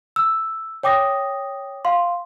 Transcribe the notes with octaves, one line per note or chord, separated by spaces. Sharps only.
E6
C#5 G5 D6 D#6 A#6
F5 C6